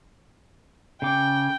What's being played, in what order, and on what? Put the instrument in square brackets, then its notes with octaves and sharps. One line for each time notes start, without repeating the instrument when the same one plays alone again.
[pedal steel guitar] C#3 D6 [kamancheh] G5